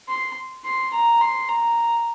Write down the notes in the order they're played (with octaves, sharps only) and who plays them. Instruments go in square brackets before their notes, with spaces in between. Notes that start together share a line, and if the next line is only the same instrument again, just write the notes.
[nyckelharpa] C6
C6
A#5
C6
A#5